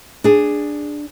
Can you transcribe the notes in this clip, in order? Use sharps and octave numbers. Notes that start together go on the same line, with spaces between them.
D4 G#4